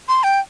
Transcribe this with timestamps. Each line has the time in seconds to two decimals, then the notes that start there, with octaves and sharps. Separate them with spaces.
0.08 C6
0.23 G5